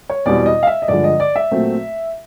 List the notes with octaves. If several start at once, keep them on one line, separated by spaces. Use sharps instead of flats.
C#5
E2 B2 G3 C4 D5
D#5
F5
E5
D#5
G2 D3 F3 G#3 D5
D#5
D5
E5
A#2 F#3 A3 C4